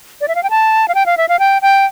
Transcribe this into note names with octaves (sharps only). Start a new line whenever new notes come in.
D5
E5
F5
G5
A5
F5
G5
F5
E5
F5
G5
G5